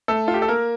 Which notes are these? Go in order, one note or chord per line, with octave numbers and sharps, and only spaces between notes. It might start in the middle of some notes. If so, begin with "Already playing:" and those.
A3 A4
F4
G4
A4
A#3 A#4